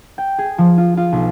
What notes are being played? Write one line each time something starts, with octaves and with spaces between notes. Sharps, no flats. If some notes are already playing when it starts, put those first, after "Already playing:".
G5
G#4
F3
F4
F4
B1